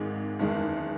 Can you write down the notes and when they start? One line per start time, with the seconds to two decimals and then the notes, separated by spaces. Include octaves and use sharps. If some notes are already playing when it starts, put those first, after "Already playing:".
Already playing: G#1 G#2 D#3 G#3
0.39 F#1 E2 D#3 G#3